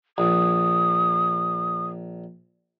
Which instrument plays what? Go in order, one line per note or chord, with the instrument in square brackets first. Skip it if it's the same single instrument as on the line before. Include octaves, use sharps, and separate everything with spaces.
[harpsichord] A#1 [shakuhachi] D#6